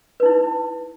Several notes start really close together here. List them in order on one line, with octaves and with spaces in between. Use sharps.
B4 D#4 E4